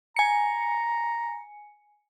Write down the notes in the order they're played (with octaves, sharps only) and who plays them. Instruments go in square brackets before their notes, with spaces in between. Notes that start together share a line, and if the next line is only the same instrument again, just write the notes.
[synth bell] G#5 C#7 [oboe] A#5